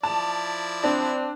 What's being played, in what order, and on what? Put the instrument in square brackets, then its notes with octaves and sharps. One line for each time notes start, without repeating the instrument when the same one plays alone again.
[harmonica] F3 E4 D5 [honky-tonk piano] A5
[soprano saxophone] C4 [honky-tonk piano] D4